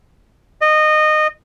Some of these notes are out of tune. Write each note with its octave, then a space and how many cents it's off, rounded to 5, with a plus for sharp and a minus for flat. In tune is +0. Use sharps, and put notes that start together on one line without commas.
D#5 -20